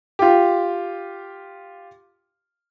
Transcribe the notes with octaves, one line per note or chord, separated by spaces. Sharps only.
F4 G4